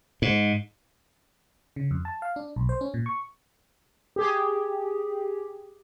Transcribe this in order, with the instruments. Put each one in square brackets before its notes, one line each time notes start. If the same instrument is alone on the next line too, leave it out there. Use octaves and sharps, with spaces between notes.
[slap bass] G#2
[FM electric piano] C#3
F2
A5
F5
D4
B1
C5
C#4
A#2
C#6
[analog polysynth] G4 G#4